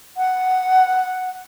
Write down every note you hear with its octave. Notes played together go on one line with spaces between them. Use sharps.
F#5